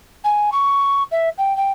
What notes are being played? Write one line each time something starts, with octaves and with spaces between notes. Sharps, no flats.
G#5
C#6
E5
G5
G5